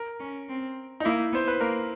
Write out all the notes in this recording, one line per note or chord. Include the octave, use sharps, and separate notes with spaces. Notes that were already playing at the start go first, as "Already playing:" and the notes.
Already playing: A#4
C#4
C4
D#4
A#3 E4
B3 C5
B4
A#3 A#4